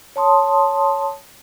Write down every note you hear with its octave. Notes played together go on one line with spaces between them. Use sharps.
C#5 A5 C6 D#6